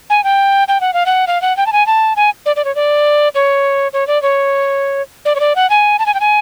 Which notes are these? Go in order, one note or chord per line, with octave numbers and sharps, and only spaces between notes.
G#5
G5
G5
F#5
F5
F#5
F5
F#5
G5
A5
G#5
A5
G#5
D5
D5
C#5
D5
C#5
C#5
D5
C#5
D5
C#5
D5
F#5
G#5
A5
G#5
G5
G#5